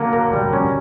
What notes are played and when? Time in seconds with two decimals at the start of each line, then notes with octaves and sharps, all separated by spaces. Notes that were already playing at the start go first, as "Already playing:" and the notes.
Already playing: D3 F#3 A#3
0.13 A#4
0.33 G3
0.53 C#4